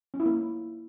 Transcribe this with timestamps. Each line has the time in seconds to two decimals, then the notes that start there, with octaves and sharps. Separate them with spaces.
0.14 C#4
0.20 E4
0.26 A#3